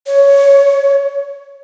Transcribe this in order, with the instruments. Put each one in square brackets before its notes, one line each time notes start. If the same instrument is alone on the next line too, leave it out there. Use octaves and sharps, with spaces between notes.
[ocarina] C#5